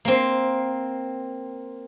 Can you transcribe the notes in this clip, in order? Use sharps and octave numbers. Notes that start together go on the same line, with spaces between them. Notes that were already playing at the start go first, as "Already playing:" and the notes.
A#3 C4